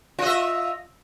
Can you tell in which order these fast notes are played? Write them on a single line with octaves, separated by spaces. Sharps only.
F4 D#5 E5